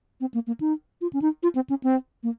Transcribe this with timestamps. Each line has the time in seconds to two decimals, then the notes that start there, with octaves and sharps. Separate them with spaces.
0.21 C4
0.34 A#3
0.47 A#3
0.60 D#4
1.01 F4
1.13 C#4
1.22 D#4
1.43 F4
1.55 C4
1.70 C#4
1.83 C4
2.23 A#3